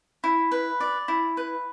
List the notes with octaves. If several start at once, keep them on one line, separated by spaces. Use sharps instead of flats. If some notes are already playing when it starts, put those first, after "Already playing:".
E4
B4
D5
E4
B4